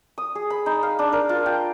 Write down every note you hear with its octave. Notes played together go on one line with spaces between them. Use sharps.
D#6
G#4
B5
D#4
F5
D4
A#4
F4
G5